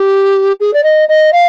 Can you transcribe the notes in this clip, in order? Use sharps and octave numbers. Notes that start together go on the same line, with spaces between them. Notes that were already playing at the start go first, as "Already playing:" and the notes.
Already playing: G4
G#4
D5
D#5
D#5
F5